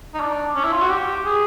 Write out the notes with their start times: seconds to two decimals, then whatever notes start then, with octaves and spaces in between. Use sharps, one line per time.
0.14 D#4
0.20 D4
0.55 C#4
0.64 E4
0.72 F4
0.82 F#4
0.90 G4
1.25 G#4